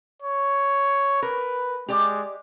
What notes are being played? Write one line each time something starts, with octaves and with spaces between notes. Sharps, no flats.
C#5
A#4 B4
G#3 G4 D5